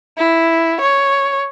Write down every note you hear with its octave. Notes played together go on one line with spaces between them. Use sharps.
E4
C#5